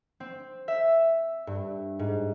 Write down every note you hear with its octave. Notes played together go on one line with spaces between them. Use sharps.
C4
E5
G2
G#2